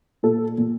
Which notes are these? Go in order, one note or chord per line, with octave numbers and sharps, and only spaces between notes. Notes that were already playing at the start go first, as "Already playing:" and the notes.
A#2 A4
A#2